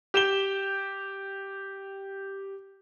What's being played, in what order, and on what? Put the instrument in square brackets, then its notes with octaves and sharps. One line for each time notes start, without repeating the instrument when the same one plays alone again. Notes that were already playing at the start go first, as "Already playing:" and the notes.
[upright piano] G4 E7 G7